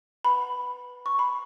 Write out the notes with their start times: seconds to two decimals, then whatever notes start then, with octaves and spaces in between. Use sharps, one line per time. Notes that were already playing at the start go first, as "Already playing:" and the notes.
0.25 B4 F#5 B5
1.06 C#6
1.19 B5